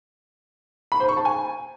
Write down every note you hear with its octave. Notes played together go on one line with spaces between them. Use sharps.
B5
C5
C#6
A5
G#5